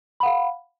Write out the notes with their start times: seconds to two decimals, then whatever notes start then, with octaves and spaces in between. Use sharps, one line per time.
0.20 B5
0.23 F#5
0.26 F5